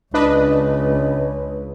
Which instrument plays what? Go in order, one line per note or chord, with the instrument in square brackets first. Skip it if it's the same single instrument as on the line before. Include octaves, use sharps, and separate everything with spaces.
[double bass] C#2 [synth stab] D4 B4 D#5